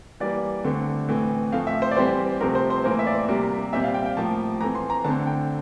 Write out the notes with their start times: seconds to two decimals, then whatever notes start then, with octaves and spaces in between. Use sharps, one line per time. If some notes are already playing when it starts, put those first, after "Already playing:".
0.20 E3 G3 A#3 D5
0.64 D3 A3 C4
1.09 A2 E3 A3 C4
1.52 A2 F3 A3 C4 F5
1.67 E5
1.82 C5
1.91 D5
1.96 E3 G3 C4 C5
2.41 C3 F3 A3 C4 A#4
2.55 C5
2.70 C5
2.84 A2 E3 A#3 C5
2.99 E5
3.07 D5
3.29 C3 G3 A#3
3.72 A#2 G3 C4 E5
3.84 F5
3.94 G5
4.06 G5
4.17 A2 F3 A#3 A5
4.60 E3 A3 C4 A#5
4.75 C6
4.90 A#5
5.04 D3 A3 C4 A5
5.27 G5